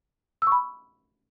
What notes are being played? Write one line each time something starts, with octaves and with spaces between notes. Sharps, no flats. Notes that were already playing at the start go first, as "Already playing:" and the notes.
B5 C#6 E6